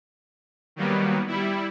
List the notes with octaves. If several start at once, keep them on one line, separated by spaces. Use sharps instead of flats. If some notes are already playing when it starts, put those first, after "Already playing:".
D#3 F#3 G3 A#3 B3
G3 E4